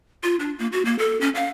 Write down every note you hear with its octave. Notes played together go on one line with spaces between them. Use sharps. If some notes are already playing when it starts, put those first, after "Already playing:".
F4
D4
A#3
F#4
A#3
A4
C#4
F5